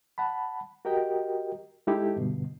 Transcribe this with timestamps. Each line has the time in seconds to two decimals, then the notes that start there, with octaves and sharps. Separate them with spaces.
0.18 F#5 A5 B5
0.85 F#4 G4 A#4 D#5 G5
1.87 G#3 D#4 E4 G4 A4
2.16 G2 B2 D3